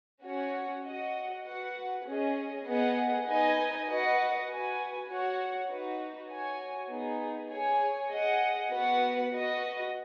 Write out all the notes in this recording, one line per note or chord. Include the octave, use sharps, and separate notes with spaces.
C#4 F#4 C#5 F#5
F#4 D#5 F#5
F#4 B4 F#5
C#4 G#4 D#5
B3 G#4 D#5 F#5
D#4 B4 D#5 G#5
F#4 B4 D#5 F#5
F#4 B4 G#5
F#4 C#5 F#5
D#4 F#4 B4
F#4 C#5 G#5
B3 D#4 G#4
G#4 C#5 G#5
G#4 D#5 F#5
B3 F#4 B4 F#5
F#4 B4 D#5